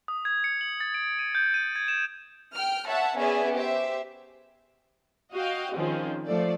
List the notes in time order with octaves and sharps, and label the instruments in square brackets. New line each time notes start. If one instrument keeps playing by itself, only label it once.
[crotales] D#6
G#6
C#7
F#7
A6
D7
D#7
G6
D#7
G#6
E7
[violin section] G5 F6
C#5 E5 F#5 A5
B3 C#4 G#4 D5 E5
G4 C5 E5
[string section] F#4 D#5 F5 G5
D#3 F3 G#3 C4 C#4
F3 A3 D5